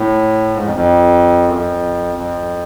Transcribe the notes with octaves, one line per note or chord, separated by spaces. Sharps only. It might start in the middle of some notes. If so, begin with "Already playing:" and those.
Already playing: A2
G#2
F2
F2
F#2
F2
F2